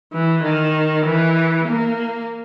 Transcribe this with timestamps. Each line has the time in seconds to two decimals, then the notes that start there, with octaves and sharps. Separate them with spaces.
0.13 E3
0.43 D#3
1.05 E3
1.68 A#3